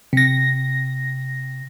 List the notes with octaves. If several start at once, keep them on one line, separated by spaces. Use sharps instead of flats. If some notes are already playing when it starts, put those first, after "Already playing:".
C3 A#6